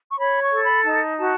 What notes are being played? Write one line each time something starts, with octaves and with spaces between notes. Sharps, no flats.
C#6
C#5 B5
C#6
A4
B5
D#4 A5
F#4 A5